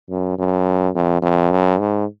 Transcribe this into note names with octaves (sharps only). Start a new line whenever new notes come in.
F#2
F#2
F2
F2
F#2
G#2